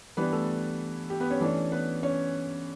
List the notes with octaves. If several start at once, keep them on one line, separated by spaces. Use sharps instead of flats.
E3 G3 B3 D4 B4
A3 A4
G4
B3 B4
C#4 C#5
E3 A3 D4
B3 B4
C#4 C#5